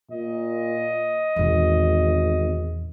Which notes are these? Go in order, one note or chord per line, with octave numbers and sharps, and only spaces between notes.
A#2 D#5
G#1 E2 A#2